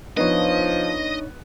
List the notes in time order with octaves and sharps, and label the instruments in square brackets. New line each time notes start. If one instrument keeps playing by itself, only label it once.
[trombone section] F3 [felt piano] B3 [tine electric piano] D4 D#4 C#5 [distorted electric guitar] D#5